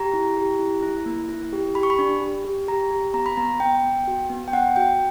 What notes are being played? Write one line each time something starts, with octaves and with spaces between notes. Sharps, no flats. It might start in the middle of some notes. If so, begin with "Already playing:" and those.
Already playing: G4 A#5
E4
G4
E4
E4
A#3
E4
G4
G4 B5
C#6
B5
D4
G4
G4
G4 A#5
G4
B3 A#5
B5
B3 A#5
B3 G5
B3
F#4
B3
G5
B3 F#5
F#4 G5